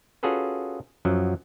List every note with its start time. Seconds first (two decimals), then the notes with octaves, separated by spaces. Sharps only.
0.23 C#4 F4 F#4 G#4 A4 B4
1.05 F#2 F3 F#3